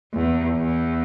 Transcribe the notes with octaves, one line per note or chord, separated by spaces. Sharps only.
E2
E2